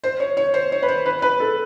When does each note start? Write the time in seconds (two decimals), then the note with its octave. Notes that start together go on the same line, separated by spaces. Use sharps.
0.04 C5
0.20 C#5
0.37 C#5
0.54 C5
0.72 C#5
0.82 B4
0.88 C5
1.06 B4
1.22 B4
1.40 A4